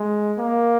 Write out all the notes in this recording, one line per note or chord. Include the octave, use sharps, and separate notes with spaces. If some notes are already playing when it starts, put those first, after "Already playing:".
Already playing: G#3
A#3